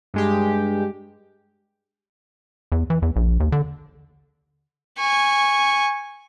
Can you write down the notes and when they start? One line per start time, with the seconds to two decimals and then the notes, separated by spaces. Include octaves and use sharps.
0.14 G2 G#3 G4
2.72 E2
2.90 E3
3.02 E2
3.16 A#1
3.40 D#2
3.52 D3
4.98 G#5 C#6